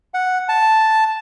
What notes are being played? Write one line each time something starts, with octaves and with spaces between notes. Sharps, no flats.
F#5
A5